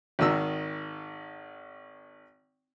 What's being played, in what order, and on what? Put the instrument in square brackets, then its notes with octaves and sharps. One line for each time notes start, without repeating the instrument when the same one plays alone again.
[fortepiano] G#1 D#3 E6